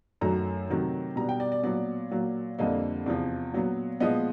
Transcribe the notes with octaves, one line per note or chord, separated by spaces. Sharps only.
F#2 D#3 F#3 A3 A#5
C3 D#3 F#3 A3
B2 G3 B3 A#5
G5
D5
D5
A#2 F#3 B3 D5
A#2 F#3 A#3
F2 D3 G3 A#3 D#5
E2 C3 F3
A#2 F#3 B3
A#2 F3 G#3 B3 D#5